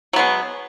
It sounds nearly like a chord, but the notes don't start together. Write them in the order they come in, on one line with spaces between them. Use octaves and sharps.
F#3 B3 G#3